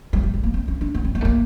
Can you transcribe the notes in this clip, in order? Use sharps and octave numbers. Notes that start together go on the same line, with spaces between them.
G3
G3
G#3
A#3
C4
C#4
D4
B3
C4
B3
A3
A#3